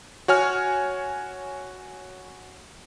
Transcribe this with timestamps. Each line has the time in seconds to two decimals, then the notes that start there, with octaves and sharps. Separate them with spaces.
0.28 F#4 C#5 G#5 F6